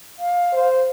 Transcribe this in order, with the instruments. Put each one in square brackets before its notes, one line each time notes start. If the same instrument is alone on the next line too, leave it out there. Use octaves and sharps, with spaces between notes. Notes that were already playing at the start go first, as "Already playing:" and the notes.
[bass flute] F5
[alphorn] C5